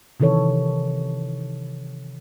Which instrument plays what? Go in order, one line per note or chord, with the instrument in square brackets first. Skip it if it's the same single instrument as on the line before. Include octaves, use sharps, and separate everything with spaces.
[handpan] C3 D#3 E3 A4 C#5